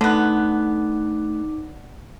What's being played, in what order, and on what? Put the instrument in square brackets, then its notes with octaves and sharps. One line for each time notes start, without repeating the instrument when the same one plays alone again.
[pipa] D3 B3 [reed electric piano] A3 F#6 [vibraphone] D#4 D6